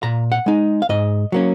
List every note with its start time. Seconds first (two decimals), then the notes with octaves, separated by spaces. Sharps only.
0.03 A#2 A#5
0.32 F#5
0.46 G#3 D#4
0.82 F5
0.89 G#2 D#5
1.32 F#3 A#3 C#4